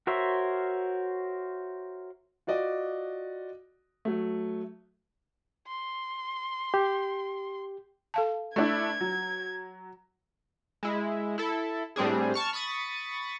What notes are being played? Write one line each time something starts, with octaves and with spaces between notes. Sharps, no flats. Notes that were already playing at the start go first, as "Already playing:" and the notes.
F#4 A#4 C5 C#5 E5
F4 F#4 D5 D#5
F#3 A3
C6
G4
A4 F5 A5
A3 D4 E4 G#6
F#3
G#3 E4
E4 A4
A2 G3 C4 D4 G#4
A5 C#6 F6
B5 C#6 D#6 A6